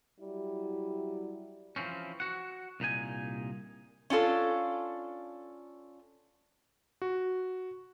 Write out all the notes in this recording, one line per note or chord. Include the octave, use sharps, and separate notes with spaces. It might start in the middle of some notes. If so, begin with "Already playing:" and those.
F#3 G3 E4
E3 F3 C4 C#4
F#4 F#5
C2 A#2 D#4 G#5
C#4 D4 F4 A4
F#4